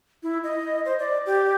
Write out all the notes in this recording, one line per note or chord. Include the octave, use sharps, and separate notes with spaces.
E4
D#5
C5
D5
G4